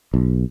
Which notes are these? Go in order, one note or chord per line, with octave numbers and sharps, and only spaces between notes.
B1